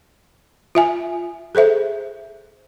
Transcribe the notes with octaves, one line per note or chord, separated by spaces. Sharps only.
F4 E5 G#5
G#4 A4 C5 E5